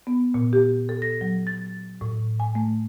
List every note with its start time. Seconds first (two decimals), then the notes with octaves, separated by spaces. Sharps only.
0.07 B3
0.34 A#2
0.53 G4
0.89 A4
1.02 A#6
1.21 F#3
1.47 A6
2.01 A2
2.40 G#5
2.55 A3